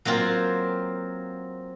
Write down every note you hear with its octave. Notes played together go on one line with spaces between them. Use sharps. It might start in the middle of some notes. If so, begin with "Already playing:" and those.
F#3 A#3 C4 F4